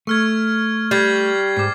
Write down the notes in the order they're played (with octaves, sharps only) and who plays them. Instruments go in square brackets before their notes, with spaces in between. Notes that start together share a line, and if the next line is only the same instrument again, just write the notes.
[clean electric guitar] A3 [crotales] C#6 F6 G#6
[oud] G3 [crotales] G#6 A6 C7
[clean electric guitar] G#2 [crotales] D6 C7